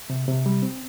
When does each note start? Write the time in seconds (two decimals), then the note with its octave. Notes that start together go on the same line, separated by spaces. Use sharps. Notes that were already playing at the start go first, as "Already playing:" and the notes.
0.10 C3
0.28 C3
0.46 G3
0.62 C4